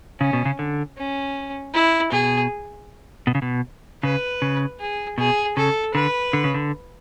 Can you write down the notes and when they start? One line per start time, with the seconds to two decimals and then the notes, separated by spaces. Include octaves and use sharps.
0.21 C#3 C#4
0.33 B2
0.45 C#3
0.59 D3
0.98 C#4
1.74 E4
2.11 B2 G#4
3.27 B2
3.35 C#3
3.42 B2
4.03 C#3 B4
4.42 C#3
4.80 G#4
5.18 B2 G#4
5.57 C#3 A4
5.94 D3 B4
6.33 D3
6.44 C#3
6.54 D3